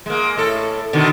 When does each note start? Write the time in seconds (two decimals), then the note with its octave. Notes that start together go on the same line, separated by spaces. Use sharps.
0.06 G#3 A#3
0.38 A2 A4
0.93 B2 D3 D#3